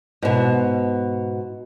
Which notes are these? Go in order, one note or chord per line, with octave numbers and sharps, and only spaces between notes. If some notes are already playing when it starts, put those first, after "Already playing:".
G#2 B2